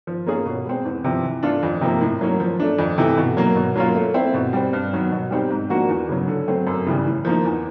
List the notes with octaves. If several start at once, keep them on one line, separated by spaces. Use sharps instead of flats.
F3
A#3 C#4 F4 G#4
B2
G#3 C4
E2
C3 F3
E3
A3 D4 F4 A4
F2
C3 F3 A#3
A2
F#3 A#3 C#4
F3
A3 D4
F2
C3 E3 A3
B2
F#3 A#3
B2
F#3 A#3 C#4 F4
A3
C4 E4
B2
G3 C4
G2
D#3 F#3 B3
B2
G3 C4 D#4 G4
G#2
F3 A#3 D4 F#4
E2
C#3 F#3
D3
F#3 A3 C4
F#2
C#3 E3 G3
A2
F3 A#3 D#4
E2